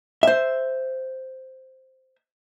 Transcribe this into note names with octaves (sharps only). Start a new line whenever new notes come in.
C5 E5